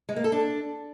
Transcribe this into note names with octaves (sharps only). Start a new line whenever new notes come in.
G#3
A#3
A4
D4